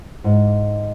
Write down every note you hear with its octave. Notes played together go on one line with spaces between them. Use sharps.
G#2